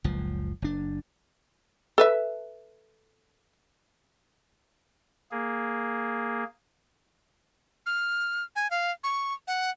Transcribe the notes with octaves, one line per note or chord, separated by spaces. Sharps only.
F#1 C#2 F3
F#1 D4
A4 B4 E5
A#3 G#4
F6
G#5
F5
C#6
F#5